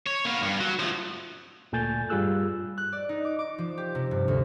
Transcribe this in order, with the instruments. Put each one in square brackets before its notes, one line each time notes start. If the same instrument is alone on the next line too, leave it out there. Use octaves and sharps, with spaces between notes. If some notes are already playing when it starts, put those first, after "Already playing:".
[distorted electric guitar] C#5
A#3 B3
G2
F#3
F3 A3
[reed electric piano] D2 A#2 A3 G#5 G6 A6
G2 G3 F4 G#4 E6 F#6
[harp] F#6
D5
D#4
D6
D6
F3
G4
C3
G2
D2